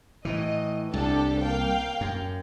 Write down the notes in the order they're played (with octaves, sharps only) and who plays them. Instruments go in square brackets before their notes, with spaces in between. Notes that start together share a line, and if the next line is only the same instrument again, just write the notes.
[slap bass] A2 E3 [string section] D#5
[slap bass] C2 [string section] D4 G4 A4
[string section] A#3 F5 G5
[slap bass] F#2